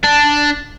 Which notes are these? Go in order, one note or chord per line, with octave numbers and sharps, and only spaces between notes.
D4